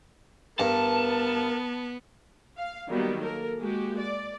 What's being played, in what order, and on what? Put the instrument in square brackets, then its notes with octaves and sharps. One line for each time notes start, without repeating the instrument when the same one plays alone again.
[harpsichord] G2 [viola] B3 [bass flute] A#4 [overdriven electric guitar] A5
[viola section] F5
D#3 F#3 G3 A#3 B3
A#3 A4 A#4
G#3 A#3 F#4 G4
D5